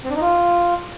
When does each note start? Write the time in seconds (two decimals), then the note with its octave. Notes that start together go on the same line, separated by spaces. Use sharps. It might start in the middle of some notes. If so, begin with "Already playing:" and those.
0.04 C4
0.10 D4
0.16 D#4
0.21 F4